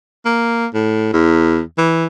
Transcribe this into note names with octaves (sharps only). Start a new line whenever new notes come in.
A#3
A2
E2
E3